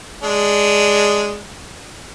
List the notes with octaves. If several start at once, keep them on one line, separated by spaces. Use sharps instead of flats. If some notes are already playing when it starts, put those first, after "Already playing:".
G#3 D4